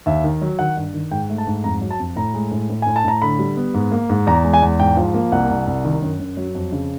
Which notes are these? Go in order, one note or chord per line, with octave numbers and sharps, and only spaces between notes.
D#2 E5
D#3
F#3
D#3 F#5
G2
D#3
G#2 G5
A3
A5
G#2
F2 A#5
F#3
A5
F2
A2 A#5
G#3
A2
A2
A2 G#5
A5
A2 A#5
D3 B5
G3
B3
G#2
A#3
G#2
E2 A#5
G#3
G#5
E2
G#2 G5
F3
A#3
C2 F#5
C2
C2
D#3
F#2
F#2
F#3
F2
C#3